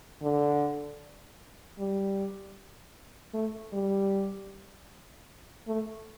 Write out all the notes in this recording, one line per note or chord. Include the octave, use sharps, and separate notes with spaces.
D3
G3
A3
G3
A3